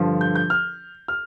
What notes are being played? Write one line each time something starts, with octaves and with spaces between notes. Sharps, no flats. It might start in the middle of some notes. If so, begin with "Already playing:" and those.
Already playing: G2 D3 F3
G6
G6
F6
F6